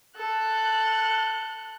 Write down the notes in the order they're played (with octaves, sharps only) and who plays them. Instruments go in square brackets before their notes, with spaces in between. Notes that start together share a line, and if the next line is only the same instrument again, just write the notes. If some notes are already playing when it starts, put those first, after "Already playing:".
[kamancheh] A4 F#6